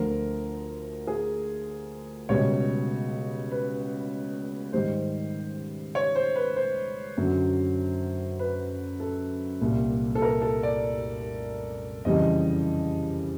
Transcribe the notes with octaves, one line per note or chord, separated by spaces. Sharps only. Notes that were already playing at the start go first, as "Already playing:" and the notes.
Already playing: D2 D3 F3 A#4
G#4
C#2 B2 G3 C#5
B4
G#2 D#3 G3 C5
C#5
C5
B4
C5
F#2 D3 F#3
B4
A4
C2 A#2 G3
A4
A#4
A4
D5
F2 C#3 E3 G3 D#5